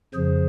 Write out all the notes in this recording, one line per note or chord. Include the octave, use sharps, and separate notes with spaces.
F2 C#3 F3 G#4 C5